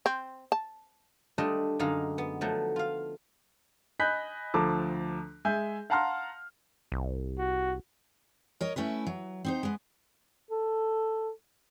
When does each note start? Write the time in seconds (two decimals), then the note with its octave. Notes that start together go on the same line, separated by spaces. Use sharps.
0.06 C4
0.52 A5
1.38 G3 A3 D4 F4 A4 D#5
1.79 F#2 D3 G#3 D#4 F5
2.18 B3
2.41 F3 F#3 A3
2.76 F4 F5
3.99 D#5 G#5 B5 F#6 G6 B6
4.54 D2 F3 A4 A5 A#5 D6
5.45 G#3 E5 G#5 G6
5.90 F5 F#5 A5 A#5 C6 F6
6.92 C2
7.38 F#4
8.61 A#4 C#5 D#5
8.76 A3 C#4 E4 B4
9.07 F#3
9.45 C4 D#4 C5
9.63 G#3 B3
10.51 A4